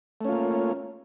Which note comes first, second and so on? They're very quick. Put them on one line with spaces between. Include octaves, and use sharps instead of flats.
A3 C#4 F4 A#3